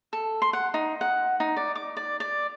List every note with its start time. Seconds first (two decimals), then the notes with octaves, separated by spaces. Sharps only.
0.13 A4
0.42 C6
0.53 F#5
0.74 D#4
1.01 F#5
1.40 D#4
1.56 D5
1.75 D6
1.97 D5
2.20 D5